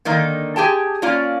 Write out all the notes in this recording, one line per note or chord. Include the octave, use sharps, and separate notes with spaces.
D3 D#3 A#3 D#4
G4 G#4 G5 A5
A#3 C#4 F4 D5